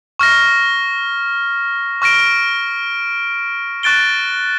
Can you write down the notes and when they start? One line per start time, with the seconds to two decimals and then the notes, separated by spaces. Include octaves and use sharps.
0.19 C#6 F6 A#6
2.02 C#6 F6 A#6 D7
3.83 C#6 F#6 A6 D7 G7